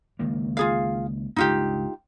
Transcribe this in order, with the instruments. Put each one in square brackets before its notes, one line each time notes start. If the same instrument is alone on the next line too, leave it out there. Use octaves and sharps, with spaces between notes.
[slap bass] C#2 D#3 A#3
[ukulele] F4 G#4 F5
[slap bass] C#2 G2 [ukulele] D#4 F4 G4